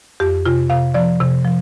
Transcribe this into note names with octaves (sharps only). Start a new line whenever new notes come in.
F2 G4
C3 F4
C3 F5
F3 D5
C3
F3